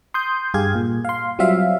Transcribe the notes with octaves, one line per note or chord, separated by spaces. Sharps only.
C6 D#6 G6
G2 G4 G#4 F5 G#6
A#2
F5 C6
F#3 G3 C4 F4 E5 F5